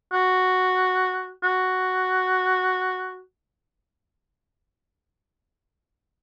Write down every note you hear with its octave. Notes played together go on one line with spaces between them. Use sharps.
F#4
F#4